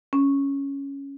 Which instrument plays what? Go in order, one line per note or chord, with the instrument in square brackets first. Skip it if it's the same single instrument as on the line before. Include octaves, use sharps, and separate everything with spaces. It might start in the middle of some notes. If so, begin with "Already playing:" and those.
[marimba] C#4